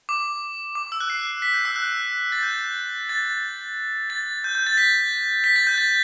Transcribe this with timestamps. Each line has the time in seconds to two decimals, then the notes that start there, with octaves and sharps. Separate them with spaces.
0.09 D6
0.75 D6
0.92 E6
1.00 F#6
1.10 C7
1.42 B6
1.54 G6
1.65 E6
1.76 F#6
2.32 A6
2.43 G6
3.09 A6
4.10 A6
4.44 G6
4.55 G6
4.67 A6
4.77 B6
5.44 B6
5.56 A6
5.67 G6
5.78 A6